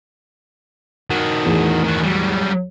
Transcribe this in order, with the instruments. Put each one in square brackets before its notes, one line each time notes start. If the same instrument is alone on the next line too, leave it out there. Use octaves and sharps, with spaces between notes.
[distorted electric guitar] D#3 F#4
[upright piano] E2 A2
[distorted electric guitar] D#3 F#4
F#3 G3